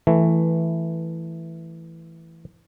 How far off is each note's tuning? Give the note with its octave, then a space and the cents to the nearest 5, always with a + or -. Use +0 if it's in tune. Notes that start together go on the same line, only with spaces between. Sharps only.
E3 +0 A3 +0